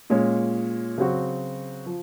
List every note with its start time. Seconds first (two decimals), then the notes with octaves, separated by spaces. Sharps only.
0.10 A#2 G#3 C#4
0.98 C#3 F#3 C4 F#4
1.86 F3